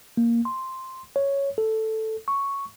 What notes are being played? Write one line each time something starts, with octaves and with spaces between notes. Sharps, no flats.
A#3
C6
C#5
A4
C#6